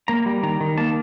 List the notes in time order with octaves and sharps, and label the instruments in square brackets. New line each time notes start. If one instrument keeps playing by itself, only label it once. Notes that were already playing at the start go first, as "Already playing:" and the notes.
[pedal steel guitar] A#3 A#5
G3
D#3 A#5
D#3
A#3 A5